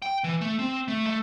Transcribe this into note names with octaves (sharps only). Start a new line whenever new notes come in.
G5
E3
A3
C4
A3
A3